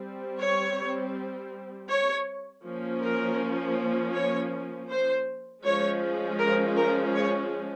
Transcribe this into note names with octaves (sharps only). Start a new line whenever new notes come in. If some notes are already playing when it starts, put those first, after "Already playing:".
Already playing: G3 C4
C#5
C#5
F3 A#3 C#4
A#4
C#5
C5
F3 G#3 C#4 C#5
A#4
A#4
C#5